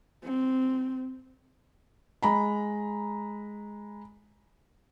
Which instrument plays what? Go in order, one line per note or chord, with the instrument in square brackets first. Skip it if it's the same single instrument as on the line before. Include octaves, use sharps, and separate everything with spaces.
[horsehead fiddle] C4
[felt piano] G#3 A#5 B5